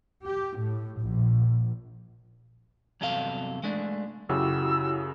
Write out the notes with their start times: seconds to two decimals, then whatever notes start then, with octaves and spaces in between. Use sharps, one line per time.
0.24 G4
0.57 A2
0.99 A#1
3.01 E2 G2 C3 F#3 A4 F5
3.64 G#3 A3 D4
4.29 F#2 C#3 E4 F#4 G4 E6